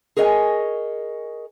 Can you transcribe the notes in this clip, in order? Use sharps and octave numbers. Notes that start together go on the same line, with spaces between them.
G#4 A#4 C#5 D#5 F5 G#5